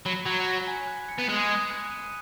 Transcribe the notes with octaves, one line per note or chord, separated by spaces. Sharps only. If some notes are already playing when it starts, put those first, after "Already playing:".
F#3 B5
F#3 G#6
B6
G#5
F#6
C#7
B3
G#3 D#6
D#6
F#6
D#7